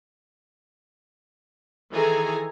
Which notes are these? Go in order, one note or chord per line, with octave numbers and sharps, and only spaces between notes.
D#3 E3 G#4 A4 G#5 A#5